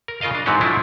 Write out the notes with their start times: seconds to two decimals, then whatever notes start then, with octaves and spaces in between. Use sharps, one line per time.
0.08 A#4
0.21 C#3 F4 A#4 D#5 F5
0.34 D4
0.46 G#2 E3 F#3 C4 F#4 G4
0.61 F3 F#3 A3 D4 E4 F4